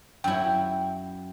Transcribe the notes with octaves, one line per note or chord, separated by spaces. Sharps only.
F#2 E4 G5